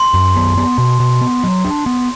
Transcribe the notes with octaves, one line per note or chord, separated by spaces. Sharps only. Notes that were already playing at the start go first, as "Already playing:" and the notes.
Already playing: C6
F#2
B3
B3
B2
B2
B3
F#3
D4
B3